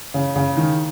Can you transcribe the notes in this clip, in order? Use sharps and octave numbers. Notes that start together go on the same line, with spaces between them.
C#3
C#3
D#3